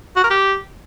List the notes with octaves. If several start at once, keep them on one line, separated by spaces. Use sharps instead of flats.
F#4
A#4
G4